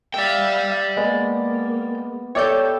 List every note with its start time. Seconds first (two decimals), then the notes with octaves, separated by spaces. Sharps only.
0.14 D5 E5 F5 G5
0.97 G#3 A#3 B3
2.35 G4 A4 C#5 D5 E5 G5 G6